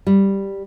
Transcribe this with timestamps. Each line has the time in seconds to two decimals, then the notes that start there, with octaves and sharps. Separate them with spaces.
0.07 G3